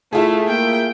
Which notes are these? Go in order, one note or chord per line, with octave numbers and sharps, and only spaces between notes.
A3 E4 F4 G#4
A#3 G5